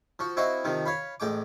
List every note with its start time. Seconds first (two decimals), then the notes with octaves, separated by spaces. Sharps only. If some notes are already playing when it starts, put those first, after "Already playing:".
0.19 F3 F#4
0.37 C4 E4 F#4 D#5 F5
0.64 C3 D#3 F3
0.86 C#5 F5 B5
1.20 A1 G#3 G5 D6